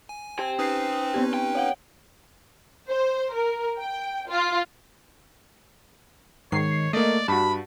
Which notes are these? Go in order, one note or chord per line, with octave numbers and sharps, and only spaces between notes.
G#5
G4 C5 G5
C#4 D#4 B4 D#6 C7
B3 C4 G4
G4 G5
C#5 F5 F#5
C5
A#4
G5
F4
G#2 D#3 C#5 C7
A3 A#3 D5 D#5
G2 F#4 A5 B5